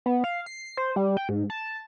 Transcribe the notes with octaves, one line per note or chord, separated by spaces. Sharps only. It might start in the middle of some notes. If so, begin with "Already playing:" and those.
B3
F5
C7
C5
G3
G5
G#2
A5